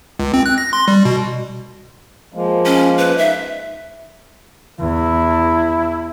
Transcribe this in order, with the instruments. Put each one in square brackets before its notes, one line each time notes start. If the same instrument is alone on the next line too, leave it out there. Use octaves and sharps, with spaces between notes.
[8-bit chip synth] C#2
C4
F#6
A#6
C6
G3
B2
[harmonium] F3 G#3 A#3
[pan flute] C#4
B4
[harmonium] D#4 [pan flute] E5
[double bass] E2 [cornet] E4